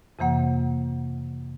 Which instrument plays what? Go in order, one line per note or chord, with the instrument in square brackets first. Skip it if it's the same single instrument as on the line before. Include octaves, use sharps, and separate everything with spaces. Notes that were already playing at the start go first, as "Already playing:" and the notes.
[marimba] F2 C3 E3 A#3 F#5